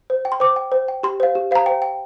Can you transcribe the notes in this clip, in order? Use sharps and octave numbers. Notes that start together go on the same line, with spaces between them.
C5
G5
C6
C5 D6
G5
C5
G5
G4 C6
C5 F5
G4
C5 F5 A#5
C5 G5
G5